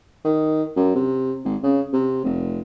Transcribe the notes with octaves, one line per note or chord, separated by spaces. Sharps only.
D#3
F#2
C3
G#1
C#3
C3
F1